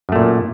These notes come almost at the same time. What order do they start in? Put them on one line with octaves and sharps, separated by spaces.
F#2 A3 A#2